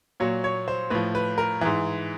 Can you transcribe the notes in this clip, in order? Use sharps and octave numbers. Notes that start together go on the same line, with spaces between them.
A#2 F#3 C#5
C#5
C5
A2 F3 B4
B4
A#4
G#2 E3